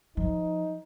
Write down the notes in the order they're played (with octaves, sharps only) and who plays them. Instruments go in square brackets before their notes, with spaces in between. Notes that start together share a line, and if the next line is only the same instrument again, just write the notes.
[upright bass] F3 [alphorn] D#4